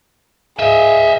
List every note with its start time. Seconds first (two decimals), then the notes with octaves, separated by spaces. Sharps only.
0.59 G#4 D#5 E5